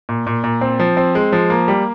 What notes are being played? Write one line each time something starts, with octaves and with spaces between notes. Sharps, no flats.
A#2
A#2
A#2
C4
F3
C4
G#3
F3
A#3
G3